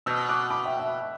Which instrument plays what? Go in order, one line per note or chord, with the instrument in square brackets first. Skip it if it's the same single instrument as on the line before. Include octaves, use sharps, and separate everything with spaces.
[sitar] B2 [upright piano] E6 G6
[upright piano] D6 F#6
B5 D6
E5 G5
E5 G5